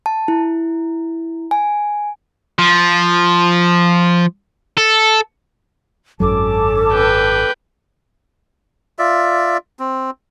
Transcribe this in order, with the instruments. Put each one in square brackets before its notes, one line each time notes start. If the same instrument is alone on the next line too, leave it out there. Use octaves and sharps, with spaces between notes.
[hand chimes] A5
E4
G#5
[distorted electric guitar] F3
A4
[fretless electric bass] G#1 F#2 F#3 [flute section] C#4 A5 D6 [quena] A4
[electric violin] B4 G5
[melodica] F4 D5 E5
C4